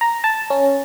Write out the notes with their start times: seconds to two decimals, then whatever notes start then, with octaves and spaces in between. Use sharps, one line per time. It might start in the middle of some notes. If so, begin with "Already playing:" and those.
0.01 A#5
0.24 A5
0.50 C#4